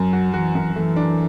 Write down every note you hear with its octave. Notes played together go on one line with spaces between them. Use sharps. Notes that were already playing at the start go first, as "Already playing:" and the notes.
Already playing: F#2 F#3
F#4
E3 F#4
F#2
E3 A3
D4